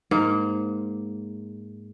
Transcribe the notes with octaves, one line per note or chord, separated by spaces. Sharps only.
G#2 A#3